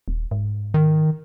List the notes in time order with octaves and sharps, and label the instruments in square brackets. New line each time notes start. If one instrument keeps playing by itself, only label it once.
[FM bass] D#1
G#2
[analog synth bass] D#3